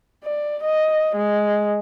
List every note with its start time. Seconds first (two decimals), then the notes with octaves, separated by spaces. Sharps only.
0.24 D5
0.63 D#5
1.16 G#3